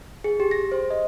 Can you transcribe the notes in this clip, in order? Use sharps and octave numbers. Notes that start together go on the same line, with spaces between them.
G#4
G4
A#6
C5
D#5